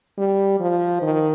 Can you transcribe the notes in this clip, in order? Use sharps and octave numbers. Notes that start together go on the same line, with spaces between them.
G3
F3
D#3